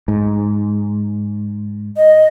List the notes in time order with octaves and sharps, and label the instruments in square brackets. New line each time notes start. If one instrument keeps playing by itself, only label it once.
[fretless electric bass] G#2
[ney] D#5